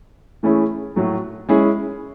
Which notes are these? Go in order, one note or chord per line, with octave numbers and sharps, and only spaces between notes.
E3 A3 C#4 E4 G#4
A2 F#3 A3
G#3 C#4 E4 G#4